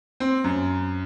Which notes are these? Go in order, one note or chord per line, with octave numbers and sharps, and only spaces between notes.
C4
F#2